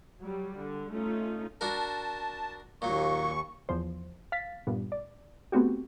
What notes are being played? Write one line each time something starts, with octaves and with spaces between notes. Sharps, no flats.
F#3 G3
D3
A3 C#4 D#4 F4
D4 F#4 A#4 A5
D#2 A#2 F#3 C#6
E2 F3 C5
F5 A6 B6
G2 A#2 B3
D5
A3 B3 C4 F#4 G4